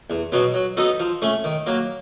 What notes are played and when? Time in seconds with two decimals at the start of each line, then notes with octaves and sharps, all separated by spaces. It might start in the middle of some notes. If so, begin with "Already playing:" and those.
0.10 E2
0.32 B2 F#3 B3
0.54 F#3
0.77 B3 D#4 F#4 A4
1.00 F3
1.22 A3 C#4
1.44 D#3
1.66 F#3 A#3